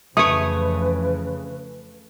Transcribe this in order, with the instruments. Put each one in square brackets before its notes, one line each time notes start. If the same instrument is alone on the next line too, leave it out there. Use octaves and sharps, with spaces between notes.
[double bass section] F2 C#3 E3 [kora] A3 C#5 [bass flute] B4 [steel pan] D#6